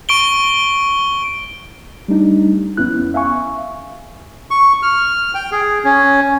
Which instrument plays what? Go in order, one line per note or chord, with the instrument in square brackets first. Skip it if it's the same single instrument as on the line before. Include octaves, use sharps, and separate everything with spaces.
[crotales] C#6 D7 G7
[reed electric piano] G3 A3 D4 D#4
F2 B3 C#4 E4 F#6
E5 F5 G#5 C#6
[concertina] C#6
F6
G5
G#4
C#4